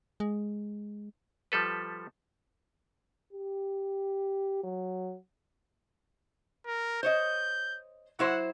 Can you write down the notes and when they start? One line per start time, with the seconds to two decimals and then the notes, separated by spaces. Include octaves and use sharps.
0.20 G#3
1.52 F3 G3 A4 B4
3.33 G4
4.64 F#3
6.67 A#4
7.03 C5 C#5 D#5 G6
8.19 F#3 E4 C5 F#5